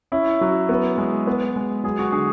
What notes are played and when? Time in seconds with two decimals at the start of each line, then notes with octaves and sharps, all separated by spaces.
0.12 C#4 E4
0.41 F#3
0.69 B3
0.98 G#3
1.27 B3
1.56 G#3
1.84 F#3 G#4
1.99 F#4
2.12 D3 G#4